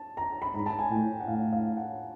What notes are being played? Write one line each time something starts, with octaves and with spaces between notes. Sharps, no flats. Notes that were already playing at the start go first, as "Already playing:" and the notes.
Already playing: A5
A#5
B5
G#2 A#5
A5
G#5
A2 G5
F#5
A2 F5
F5
F#5